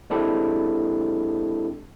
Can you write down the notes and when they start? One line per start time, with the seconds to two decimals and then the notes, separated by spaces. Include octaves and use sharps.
0.10 G#3 C4 D4 E4 G4 A4